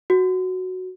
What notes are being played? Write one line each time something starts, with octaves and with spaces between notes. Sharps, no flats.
F#4